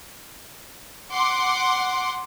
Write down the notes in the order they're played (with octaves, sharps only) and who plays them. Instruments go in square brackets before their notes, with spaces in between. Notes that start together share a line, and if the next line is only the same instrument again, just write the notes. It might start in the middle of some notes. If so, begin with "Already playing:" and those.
[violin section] F#5 C6 D6